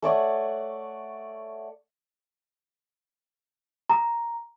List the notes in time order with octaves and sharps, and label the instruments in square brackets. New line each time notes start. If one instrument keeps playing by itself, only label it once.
[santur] A3 C#5 D5 F#5
[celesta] A#5